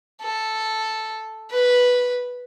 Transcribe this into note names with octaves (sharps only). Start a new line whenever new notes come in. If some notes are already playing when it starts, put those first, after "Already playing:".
A4
B4